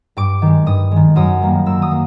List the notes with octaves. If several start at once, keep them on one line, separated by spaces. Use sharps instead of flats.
G2 D6
D#3 G#3
G2 D#6
D#3 G#3
F#2 D#6
D#3 G3 A#3
F#2 E6
D#6
A#3